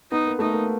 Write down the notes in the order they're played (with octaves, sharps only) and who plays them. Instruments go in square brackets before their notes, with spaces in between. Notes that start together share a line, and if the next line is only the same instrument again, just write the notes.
[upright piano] B3 [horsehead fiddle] D#4
[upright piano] A#3
[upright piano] A3 [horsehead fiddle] D#4
[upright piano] A#3